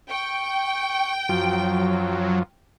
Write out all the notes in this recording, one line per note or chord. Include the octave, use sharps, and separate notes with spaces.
G5 C#6
F#2 F3 F#3